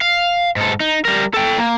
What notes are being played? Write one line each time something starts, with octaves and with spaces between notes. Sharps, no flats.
F5
G#2 A4
D#4
G3 A#4
A4 G5
A#3